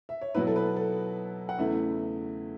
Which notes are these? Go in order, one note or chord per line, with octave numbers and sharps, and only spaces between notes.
E5
C#5
B2 F#3 B3 E4 B4
A4
B4
A4
F#5
E2 C#3 A3 E4 E5